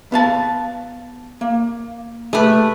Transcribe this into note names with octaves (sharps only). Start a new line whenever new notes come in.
B3 F5 A5
A#3
A3 G4 B4